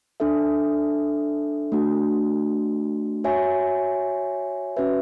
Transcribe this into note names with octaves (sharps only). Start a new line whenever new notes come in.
D4 A4 E5
A3 D4 F#4
F#4 C#5 E5 G#5
C#4 F#4 B4 E5